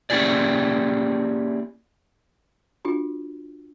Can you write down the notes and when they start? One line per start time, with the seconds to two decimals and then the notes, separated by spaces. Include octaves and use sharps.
0.10 A#3 C#4 E4 G4 G#4 D5
2.85 D4 F4 F#4